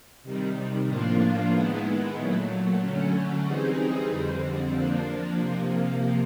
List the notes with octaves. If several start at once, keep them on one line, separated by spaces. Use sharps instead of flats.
C3 D#3 G3
A2 F3 A#3 D4 F4
D#3 G#3 B3 E4
A#2 F#3 A3
D3 F#3 A3 C#4
E3 G3 C4 D#4 G#4
F2 D3 G3 C4
F3 A#3 D4
C3 F3 A#3